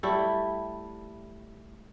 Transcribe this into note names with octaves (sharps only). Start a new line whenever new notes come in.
G3 A3 E4